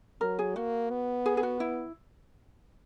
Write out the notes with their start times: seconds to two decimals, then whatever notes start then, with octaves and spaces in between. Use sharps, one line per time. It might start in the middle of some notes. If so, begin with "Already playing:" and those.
0.21 F#3 A#4
0.39 G#4
0.56 A#3 F#4
0.90 B3
1.26 G#4
1.37 G#4
1.43 F#4
1.60 E4